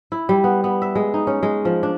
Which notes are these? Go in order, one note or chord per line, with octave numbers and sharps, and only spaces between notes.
E4
G3
B3
B3
E5
G#3
D#4
C#4
G#3
F3
D4